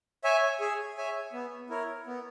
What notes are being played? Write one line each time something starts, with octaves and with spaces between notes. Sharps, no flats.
C#5 E5 G#5
G#4
C#5 E5 G#5
B3
E4 A#4 C#5
B3